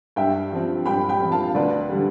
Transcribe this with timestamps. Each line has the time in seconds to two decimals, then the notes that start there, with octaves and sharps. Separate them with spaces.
0.16 G2 E5 G5
0.52 F3 C4
0.86 G2 G5 B5
1.09 G5 B5
1.21 F3 C4
1.32 F5 A5
1.55 D2 B4 D5
1.89 D3 G3